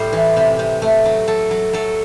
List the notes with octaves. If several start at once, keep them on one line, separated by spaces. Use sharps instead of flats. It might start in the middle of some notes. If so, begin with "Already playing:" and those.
Already playing: A2 G3 C5
E3
C3
C3
A3
F#3
F#3 A4
F#3
F#3 A4